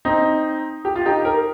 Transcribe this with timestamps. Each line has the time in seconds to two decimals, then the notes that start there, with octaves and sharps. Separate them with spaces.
0.05 C4 D#4
0.85 G4
0.96 F4
1.05 D#4 G4
1.25 A#4